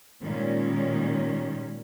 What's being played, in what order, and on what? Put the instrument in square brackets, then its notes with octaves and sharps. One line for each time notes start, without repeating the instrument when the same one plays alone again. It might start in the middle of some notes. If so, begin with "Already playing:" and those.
[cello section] A#2 D#3 G3 G#3 C#4